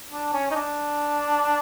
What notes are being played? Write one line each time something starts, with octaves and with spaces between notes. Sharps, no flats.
D4
C#4
D#4
D4